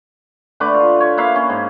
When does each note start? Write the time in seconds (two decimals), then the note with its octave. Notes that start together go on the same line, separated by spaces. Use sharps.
0.60 D3 A3 B4 D6
0.74 F4
1.00 C#5
1.17 A#3 B4 E5 F5
1.35 C#4
1.50 G#2